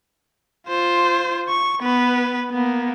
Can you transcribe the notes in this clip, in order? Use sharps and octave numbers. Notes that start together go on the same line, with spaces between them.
F4 C5
C#6
B3 B4
A#3 B3